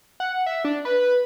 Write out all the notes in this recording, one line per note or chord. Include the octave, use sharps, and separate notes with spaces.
F#5
E5
D4
B4